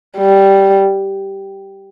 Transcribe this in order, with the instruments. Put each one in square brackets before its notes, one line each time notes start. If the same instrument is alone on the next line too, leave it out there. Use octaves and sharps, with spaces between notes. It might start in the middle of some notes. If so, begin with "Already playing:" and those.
[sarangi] G3